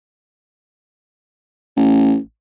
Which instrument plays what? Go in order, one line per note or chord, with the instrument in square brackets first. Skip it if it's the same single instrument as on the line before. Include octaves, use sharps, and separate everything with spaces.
[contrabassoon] A1